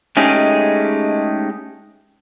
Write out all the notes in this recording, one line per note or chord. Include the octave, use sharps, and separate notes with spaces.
G#3 A3 C#4 D#4 G4 G#4